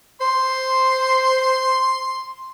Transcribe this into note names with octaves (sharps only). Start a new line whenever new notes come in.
C5 C6